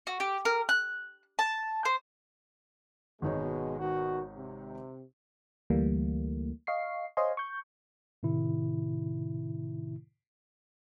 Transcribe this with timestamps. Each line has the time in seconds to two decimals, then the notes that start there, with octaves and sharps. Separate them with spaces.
0.07 F#4
0.20 G4
0.45 A#4
0.69 F#6
1.39 A5
1.85 C5
3.22 G#1 B2 G#3 D#4 C#5
3.79 B2 D#3 F#4
4.36 C3
5.70 D2 E3 G3 A3 A#3
6.67 D#5 F5 C#6 C7
7.17 C5 C#5 D#5 F5 G#5 C6
7.37 C#6 G6
8.23 A2 C3 D#3 E4